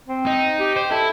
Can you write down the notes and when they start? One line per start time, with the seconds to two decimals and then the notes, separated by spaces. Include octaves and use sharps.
0.08 C4
0.26 D#4
0.60 G4
0.76 C5
0.91 E4 A4